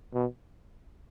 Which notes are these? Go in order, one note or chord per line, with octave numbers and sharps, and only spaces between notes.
B2